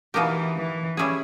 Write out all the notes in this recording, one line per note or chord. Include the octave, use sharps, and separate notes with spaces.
B2 E3 A#3 D#4 G4 A#4
E3
G3 C#4 E4 G#4